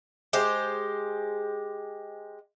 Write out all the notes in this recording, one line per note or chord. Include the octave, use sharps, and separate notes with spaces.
G#3 G4 C5